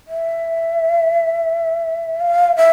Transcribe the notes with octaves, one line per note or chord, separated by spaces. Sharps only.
E5
F5
E5